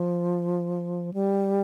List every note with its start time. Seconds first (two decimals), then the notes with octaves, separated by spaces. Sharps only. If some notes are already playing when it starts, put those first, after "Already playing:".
Already playing: F3
1.14 G3